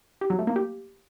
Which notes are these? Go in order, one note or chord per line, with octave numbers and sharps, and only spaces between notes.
G4
F#3
A3
A#3
G4